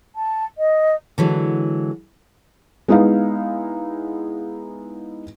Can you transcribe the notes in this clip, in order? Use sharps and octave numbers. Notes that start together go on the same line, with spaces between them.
A5
D#5
D3 E3 F#3 G#3
G#3 B3 D#4 E4 F5